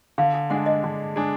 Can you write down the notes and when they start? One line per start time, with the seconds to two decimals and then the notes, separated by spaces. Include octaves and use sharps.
0.18 D3 F5
0.34 G#5
0.50 G#3 D4 G#4 F#5
0.66 D#5
0.84 D3
1.16 G#3 D4 G#4